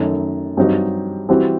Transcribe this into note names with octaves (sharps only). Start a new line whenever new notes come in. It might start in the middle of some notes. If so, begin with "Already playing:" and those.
Already playing: F#2 D#3 A3 D#4 A4
G2 F#3 C4 D#4 F#4
E3 G3 C4 F#4